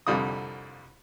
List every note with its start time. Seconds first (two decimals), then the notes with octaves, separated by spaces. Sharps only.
0.07 C2 F2 D3 G3 F4 D#6